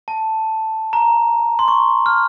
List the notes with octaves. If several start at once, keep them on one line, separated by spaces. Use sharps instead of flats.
A5
A#5
C6
C#6
F6